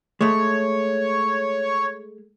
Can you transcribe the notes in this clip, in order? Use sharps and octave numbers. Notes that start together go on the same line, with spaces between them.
G#3 A3 C#5